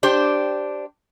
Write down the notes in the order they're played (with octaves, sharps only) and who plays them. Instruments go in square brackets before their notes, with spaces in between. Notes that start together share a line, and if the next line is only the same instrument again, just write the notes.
[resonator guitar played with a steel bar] D4 G4 C5